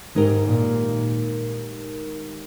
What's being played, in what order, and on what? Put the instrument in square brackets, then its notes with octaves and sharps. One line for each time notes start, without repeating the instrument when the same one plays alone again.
[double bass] G#2 [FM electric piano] D#3 G#3 D#4 G4 A#4
[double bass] A#2